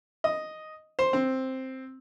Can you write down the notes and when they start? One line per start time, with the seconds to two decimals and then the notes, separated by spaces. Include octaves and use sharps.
0.24 D#5
0.99 C5
1.13 C4